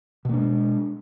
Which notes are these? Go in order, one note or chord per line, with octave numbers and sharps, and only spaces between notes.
B2 G#3 A#3 D4